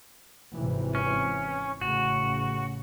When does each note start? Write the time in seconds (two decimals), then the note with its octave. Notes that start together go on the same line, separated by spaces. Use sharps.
0.55 G#1 C3 E3
0.95 C#4
1.81 A1 C#3 F#4